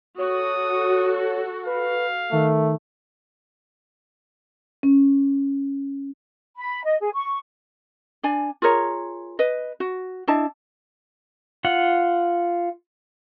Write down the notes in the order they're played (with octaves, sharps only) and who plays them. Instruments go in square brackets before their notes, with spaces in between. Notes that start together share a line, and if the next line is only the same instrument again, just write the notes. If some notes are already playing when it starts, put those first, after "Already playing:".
[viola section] F#4 A4 [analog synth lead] C#5 [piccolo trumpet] D#6
[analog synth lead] B4 [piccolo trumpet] F5
[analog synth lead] D#3 [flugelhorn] A3
[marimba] C#4
[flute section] B5
D#5
G#4
C#6
[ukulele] D4 D5 G#5
F4 G#4 A#4 C#5
B4 D#5
F#4
D4 E4 D#5 A5
[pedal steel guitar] F4 F#5